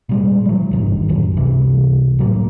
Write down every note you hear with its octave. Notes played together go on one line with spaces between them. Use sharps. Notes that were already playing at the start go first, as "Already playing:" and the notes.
A#2 G3 G#3
E3 F#3
D#1 G#1 G2 D#3
A1 F#2
G1 C#2 C3 E3
A2 F#3 A3 A#3